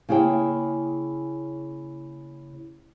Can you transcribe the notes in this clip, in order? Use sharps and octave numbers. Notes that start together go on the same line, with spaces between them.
C#3 A#3 E4 G#4 C#5 G5